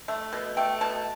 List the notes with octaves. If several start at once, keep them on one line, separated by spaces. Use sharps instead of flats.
A3
B2
A3 G5
B2 A5